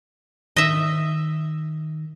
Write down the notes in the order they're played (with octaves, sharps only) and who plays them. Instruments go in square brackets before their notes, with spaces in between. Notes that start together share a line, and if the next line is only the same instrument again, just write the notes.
[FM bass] D#3 [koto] D#5 E5